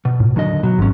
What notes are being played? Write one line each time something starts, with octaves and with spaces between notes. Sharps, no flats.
B2
A2
D#2 D3 F#3 D#5
B2 F#3
G#1 G#2 C#4